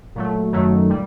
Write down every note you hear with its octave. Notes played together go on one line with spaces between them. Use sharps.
A#2 F#3 A3
F#2 D#3 F#3 A3
A#2 G3